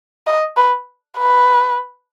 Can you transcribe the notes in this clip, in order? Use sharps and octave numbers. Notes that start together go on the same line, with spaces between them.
D#5
B4
B4